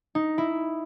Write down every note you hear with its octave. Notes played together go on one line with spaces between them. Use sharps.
D#4
E4